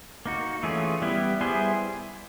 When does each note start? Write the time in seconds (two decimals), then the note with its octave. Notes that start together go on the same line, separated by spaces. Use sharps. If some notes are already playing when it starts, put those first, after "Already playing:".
0.26 A#3 D#4 F#4
0.63 E3 A3 C#4 F4 G#4
1.02 G3 B3 E4
1.41 G3 B3 E4 G#4 C5